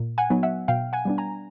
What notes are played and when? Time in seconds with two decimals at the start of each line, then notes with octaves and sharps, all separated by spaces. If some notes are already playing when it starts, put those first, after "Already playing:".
Already playing: A#2
0.18 F#5 G#5
0.30 F#3 B3 D#4
0.43 E5 F#5
0.68 B2 F5 G5
0.93 F#5 G#5
1.05 G3 B3 D4
1.18 G#5 A#5